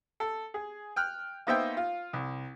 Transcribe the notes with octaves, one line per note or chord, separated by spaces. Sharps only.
A4
G#4
G5 F6 F#6
A#3 B3 D#4 C5 E5 G5
F4
C2